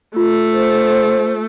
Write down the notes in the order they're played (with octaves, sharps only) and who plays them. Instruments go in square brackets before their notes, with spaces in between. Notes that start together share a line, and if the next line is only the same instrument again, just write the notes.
[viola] A3 [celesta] F4
[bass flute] C5